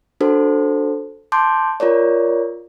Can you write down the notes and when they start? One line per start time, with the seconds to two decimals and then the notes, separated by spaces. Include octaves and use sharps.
0.20 D4 F#4 A4 C5
1.32 A5 C6 D6 G6
1.80 F4 A#4 C#5 D5